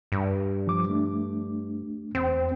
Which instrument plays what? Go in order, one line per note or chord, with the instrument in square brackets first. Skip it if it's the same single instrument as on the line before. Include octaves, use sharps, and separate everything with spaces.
[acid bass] G2
[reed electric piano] F3 D6
A3 D4
[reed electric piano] E2 G5 [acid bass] C4